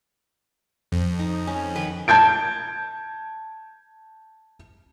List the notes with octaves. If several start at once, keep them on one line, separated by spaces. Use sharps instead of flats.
F2
D#4
C#4
D#3 B4
A5 G6 G#6 D7